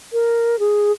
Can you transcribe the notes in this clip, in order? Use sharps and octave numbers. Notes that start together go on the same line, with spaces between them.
A#4
G#4